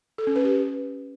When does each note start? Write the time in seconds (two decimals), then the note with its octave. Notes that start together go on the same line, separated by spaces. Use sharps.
0.18 A4
0.27 C#4
0.36 B4
0.44 G4